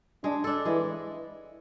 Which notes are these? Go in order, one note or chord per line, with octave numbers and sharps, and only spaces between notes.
G#3 D4
D4 A4
E3 G#3